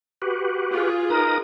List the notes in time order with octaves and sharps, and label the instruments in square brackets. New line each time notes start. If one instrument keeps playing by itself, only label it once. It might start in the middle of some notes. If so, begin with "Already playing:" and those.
[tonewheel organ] F#4 G4 B4
[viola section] F4 G#4
[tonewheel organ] D#4 B4 D#6 [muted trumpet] A#4